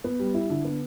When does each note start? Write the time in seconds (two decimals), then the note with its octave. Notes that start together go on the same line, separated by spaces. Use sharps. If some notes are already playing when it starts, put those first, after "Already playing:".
0.04 B3
0.19 G3
0.34 E4
0.50 D3
0.65 B3